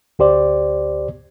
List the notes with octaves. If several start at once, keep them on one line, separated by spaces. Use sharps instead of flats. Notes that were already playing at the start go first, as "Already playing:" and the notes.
D2 G4 C5 D5